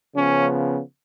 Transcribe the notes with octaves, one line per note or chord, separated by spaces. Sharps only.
C#3 F3 B3 C#4